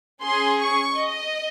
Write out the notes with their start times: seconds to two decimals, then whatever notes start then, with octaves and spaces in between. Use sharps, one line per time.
0.21 C#4 G#4 C6
0.59 C#6
0.96 D#5